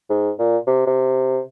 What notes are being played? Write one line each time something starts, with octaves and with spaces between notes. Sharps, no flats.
G#2
A#2
C3
C3